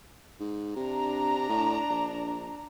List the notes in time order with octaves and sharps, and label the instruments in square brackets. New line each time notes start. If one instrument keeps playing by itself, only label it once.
[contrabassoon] G#2
[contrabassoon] C3 [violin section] D4 A#5
[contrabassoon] A2
A#1